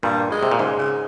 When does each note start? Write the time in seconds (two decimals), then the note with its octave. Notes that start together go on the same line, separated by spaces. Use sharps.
0.03 G2 A#2 G3
0.32 G#3
0.43 C3
0.51 A#2
0.59 G#2 C#3
0.78 C#3